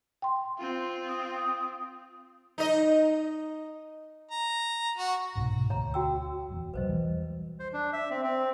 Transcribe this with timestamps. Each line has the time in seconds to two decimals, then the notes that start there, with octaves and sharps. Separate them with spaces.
0.22 G5 C6
0.58 C4 F4
1.08 D#6
2.58 D#4 D#5
4.31 A#5
4.97 F#4
5.35 C2 G#2 B2
5.70 D2 C#5 A#5
5.94 F#4 G5 E6
6.48 D#1 E2
6.74 B1 F#3 B4 C5 D#5
6.88 E2 E3 G3
7.60 C5
7.73 D4
7.93 E5
8.10 C4
8.24 C4